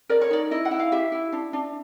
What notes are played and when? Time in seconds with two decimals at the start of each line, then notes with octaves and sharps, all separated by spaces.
0.09 A#4 D5
0.21 C#5
0.31 D#4 D5
0.51 E4 D#5
0.65 F#5
0.71 E4
0.79 F5
0.92 G4 E5
1.12 E4
1.32 D4
1.53 D4